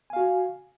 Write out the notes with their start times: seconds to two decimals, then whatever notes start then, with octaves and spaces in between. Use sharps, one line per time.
0.10 G#5
0.13 F5
0.16 F#4